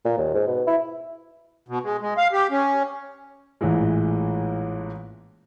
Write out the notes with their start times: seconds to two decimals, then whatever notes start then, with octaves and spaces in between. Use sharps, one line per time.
0.05 A#2
0.18 D#2
0.34 G#2
0.47 B2
0.67 E4
1.68 B2
1.83 G#3
2.01 G#3
2.18 F5
2.33 G4
2.51 C#4
3.61 A1 A#2 E3 G#3